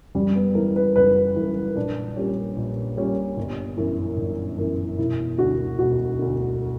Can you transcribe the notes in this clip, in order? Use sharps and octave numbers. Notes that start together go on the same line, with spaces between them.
F#1 G3
B3
F#2 E3 A#4
B4
F#1 B4
F#2 E3
A#1 D4
A#2 G3 C#4 G4
A#1
A#2 G3 C#4 G4
G1
F#2 E3
G1
F#2 E3
E1 E4
D2 D3 F#4
E1 F#4
D2 D3